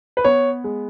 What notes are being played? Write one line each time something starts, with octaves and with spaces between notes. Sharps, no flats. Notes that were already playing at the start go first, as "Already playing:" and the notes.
B4
B3 C#5
G#3